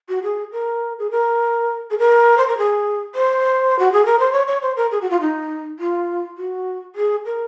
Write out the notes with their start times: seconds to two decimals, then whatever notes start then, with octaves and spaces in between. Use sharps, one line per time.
0.08 F#4
0.23 G#4
0.52 A#4
0.99 G#4
1.10 A#4
1.90 G#4
1.98 A#4
2.37 C5
2.47 A#4
2.57 G#4
3.15 C5
3.79 F#4
3.92 G#4
4.05 A#4
4.19 C5
4.32 C#5
4.47 C#5
4.62 C5
4.76 A#4
4.91 G#4
5.01 F#4
5.10 F4
5.20 D#4
5.79 F4
6.37 F#4
6.95 G#4
7.25 A#4